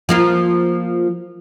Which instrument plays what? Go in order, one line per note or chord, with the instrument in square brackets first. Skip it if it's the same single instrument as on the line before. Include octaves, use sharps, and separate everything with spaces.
[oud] F3 A#3 F4